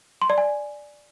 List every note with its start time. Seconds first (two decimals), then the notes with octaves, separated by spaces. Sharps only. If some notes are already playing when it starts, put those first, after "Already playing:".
0.22 C6
0.30 D5
0.38 G#5